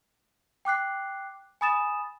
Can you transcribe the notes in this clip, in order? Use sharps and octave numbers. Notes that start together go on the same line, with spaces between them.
G5 D6 F#6 C7
G#5 B5 D#6 A6 E7